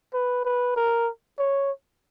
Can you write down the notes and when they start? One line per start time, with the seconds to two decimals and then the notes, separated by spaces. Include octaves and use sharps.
0.14 B4
0.45 B4
0.76 A#4
1.39 C#5